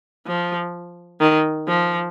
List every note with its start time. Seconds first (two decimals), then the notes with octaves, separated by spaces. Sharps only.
0.27 F3
1.20 D#3
1.68 F3